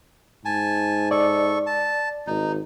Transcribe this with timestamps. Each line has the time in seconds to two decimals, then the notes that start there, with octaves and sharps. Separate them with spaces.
0.45 G#2 G#5 A5
1.11 A4 D5 C#6
1.66 A5
2.27 G#1 D#4